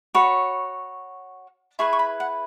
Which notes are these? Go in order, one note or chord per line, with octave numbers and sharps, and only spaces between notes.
F#4 C#5 B5
E4 G#4 B4 C#6
C#6
B5
F#5